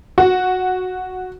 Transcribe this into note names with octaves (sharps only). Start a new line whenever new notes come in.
F#4